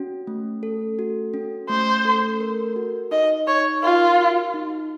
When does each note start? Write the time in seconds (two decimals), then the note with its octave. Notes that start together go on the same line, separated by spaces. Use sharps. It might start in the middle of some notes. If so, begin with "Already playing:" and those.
Already playing: C#4 F#4
0.27 A3
0.63 A4
0.99 F#4
1.34 C#4
1.69 A3 C5
2.05 A4
2.41 A#4
2.76 F#4
3.11 D#4 D#5
3.48 D#4 C#5
3.83 F4 A#4
4.18 F#4
4.54 D#4